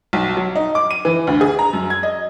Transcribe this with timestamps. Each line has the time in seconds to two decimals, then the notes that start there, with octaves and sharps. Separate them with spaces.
0.13 B1
0.37 F#3
0.56 D#4
0.75 D6
0.91 D#7
1.05 E3
1.27 D2
1.41 G#4
1.59 A#5
1.73 F#2
1.90 G#6
2.03 D#5